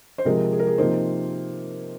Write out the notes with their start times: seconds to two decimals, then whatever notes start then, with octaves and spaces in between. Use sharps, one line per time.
0.18 C5
0.25 C3 F3 G#3 A#4
0.52 G#4
0.59 A#4
0.67 G#4
0.78 C3 F3 A#3 D#4 C5